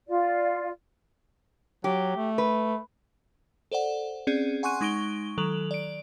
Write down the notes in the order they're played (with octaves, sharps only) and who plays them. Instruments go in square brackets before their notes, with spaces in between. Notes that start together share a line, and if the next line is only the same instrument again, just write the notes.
[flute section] F4 D5
[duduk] F#3 [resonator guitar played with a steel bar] G4
[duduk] A3
[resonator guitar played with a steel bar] B4
[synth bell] A4 C5 D5 F#5
C4 C#4 G#4 D5
F#5 G#5 C6 C#6 F#6 D#7
G#3 D#4 C#6 D7 G7
D#3 F#3 A4 F7 F#7
D5 D7